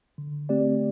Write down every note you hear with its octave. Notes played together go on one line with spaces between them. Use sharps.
D3
A3 C4 G4 D5